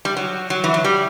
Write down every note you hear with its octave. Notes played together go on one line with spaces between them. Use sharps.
G3
F#3
F#3
E3
F#3
G3